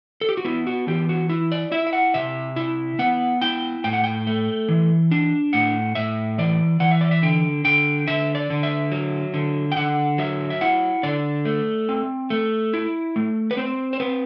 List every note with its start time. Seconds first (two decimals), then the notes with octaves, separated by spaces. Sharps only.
0.21 A4
0.29 G4
0.37 F#4
0.45 B3 E4
0.67 F#4
0.87 E3 G4
1.09 F#4
1.29 E4
1.52 D5
1.72 E4 E5
1.87 E5
1.93 F#5
2.14 C3 E5
2.56 E4
2.99 B3 F#5
3.41 E4 G5
3.84 A2 G5
3.93 F#5
4.04 G5
4.27 A3
4.68 E3
5.11 D4
5.53 A2 F#5
5.95 A2 E5
6.38 E3 D5
6.80 E3 F#5
6.91 E5
7.01 D5
7.11 E5
7.22 D3 G5
7.65 D3 G5
8.08 D3 E5
8.35 D5
8.50 D3
8.63 E5
8.92 F#3
9.34 D3
9.72 G5
9.76 D3 F#5
10.18 F#3 E5
10.50 E5
10.61 E4 F#5
11.03 D3 D5
11.45 A3
11.89 C4
12.30 A3
12.74 E4
13.16 A3
13.51 B4
13.57 C4 C5
13.93 C5
14.00 C4 B4